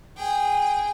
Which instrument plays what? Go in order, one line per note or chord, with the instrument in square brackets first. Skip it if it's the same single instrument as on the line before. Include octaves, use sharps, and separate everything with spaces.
[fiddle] G#4 G5